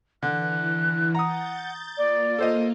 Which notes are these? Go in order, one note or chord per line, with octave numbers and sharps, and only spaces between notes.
D3 E3 F#6
F#5 A#5 D#6 G6 A6
A#3 F4 D5
A4 C5 D#5